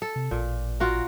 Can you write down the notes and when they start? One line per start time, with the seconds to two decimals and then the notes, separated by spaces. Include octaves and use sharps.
0.02 A4
0.16 C3
0.31 A1 A#2
0.80 F4 F#4 A#4